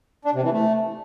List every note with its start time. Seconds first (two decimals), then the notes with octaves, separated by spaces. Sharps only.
0.25 D4
0.34 C3
0.43 E3
0.53 A3